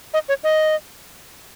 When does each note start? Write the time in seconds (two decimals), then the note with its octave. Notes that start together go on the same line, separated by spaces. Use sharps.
0.14 D#5
0.29 C#5
0.44 D#5